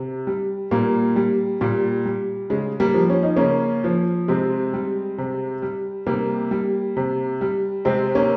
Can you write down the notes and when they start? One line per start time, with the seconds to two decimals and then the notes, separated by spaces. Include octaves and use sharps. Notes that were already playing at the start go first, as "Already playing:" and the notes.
Already playing: C3
0.27 G3
0.71 A#2 G3 A#3
1.16 G3
1.61 A#2 G3
2.05 G3
2.50 C#3 G#3
2.80 G3 A#3
2.94 F3
3.10 C#4
3.23 D#4
3.36 C#3 A#3 C#4
3.84 F3
4.28 C3 G#3 C4
4.74 G3
5.18 C3
5.62 G3
6.07 C3 G3 A#3
6.51 G3
6.97 C3
7.41 G3
7.85 C3 G#3 C4
8.15 A#3 C#4